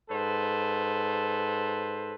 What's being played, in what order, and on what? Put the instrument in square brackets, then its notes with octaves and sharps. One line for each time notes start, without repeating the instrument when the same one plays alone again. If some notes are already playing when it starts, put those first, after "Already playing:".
[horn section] G#2 A4 B4 C5